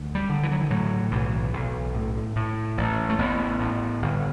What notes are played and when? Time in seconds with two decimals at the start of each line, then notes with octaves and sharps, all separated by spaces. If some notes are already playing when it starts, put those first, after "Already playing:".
Already playing: D2
0.15 G3
0.29 D3
0.43 E3
0.51 F#3
0.61 E3
0.70 A2 F#3
1.12 B1 E3
1.53 B1
1.94 A2
2.36 A2
2.77 A1
3.10 A3
3.19 A1 B3
3.60 A2
4.02 G1